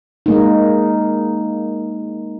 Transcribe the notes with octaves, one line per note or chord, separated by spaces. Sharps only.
G#3 A#3 D#4